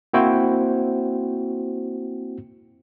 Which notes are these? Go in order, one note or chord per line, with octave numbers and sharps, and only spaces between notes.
A#3 C4 E4 F#4 C5 G5